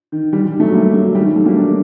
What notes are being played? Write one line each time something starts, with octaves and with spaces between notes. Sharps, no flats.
D#3
D#3 G3
D#3 G3
F#3 A3
G3 A#3
F#3 A3
D#3 G3
D#3 G3
F#3 A3
G3 A#3
A#3 D4